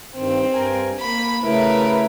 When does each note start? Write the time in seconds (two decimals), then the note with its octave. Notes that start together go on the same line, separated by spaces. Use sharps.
0.17 G2 D#3 C4
0.53 G2 A#4 G#5
1.00 A#3 B5
1.43 C#3 A3 E4 A#4 B4